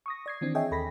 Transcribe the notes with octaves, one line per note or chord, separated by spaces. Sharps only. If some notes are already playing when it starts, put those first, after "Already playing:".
C#6 D#6 A#6
D5 G#6 C7
D#3 E3 C4 D4
G#4 C#5 D#5 E5 G5 G#5
D#2 A4 B5 A#6 B6